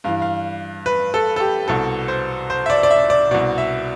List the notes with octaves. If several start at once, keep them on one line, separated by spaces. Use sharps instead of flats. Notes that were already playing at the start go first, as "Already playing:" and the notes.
G2 E3 F5
F5
B4
A4
A4
G4
C2 B2 A4
C5
C5
E5
D5
D5
E5
D5
C2 B2 D5
E5